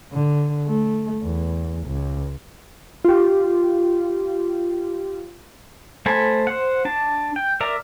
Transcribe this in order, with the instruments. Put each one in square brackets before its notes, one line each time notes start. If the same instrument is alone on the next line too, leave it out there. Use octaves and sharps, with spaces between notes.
[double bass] D3
A3
E2
C#2
[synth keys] F4 G4
[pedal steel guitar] A3 C5 G#5 A5 B5
C5 F#5
D4 A5
G5
A#4 D5 E5 A#5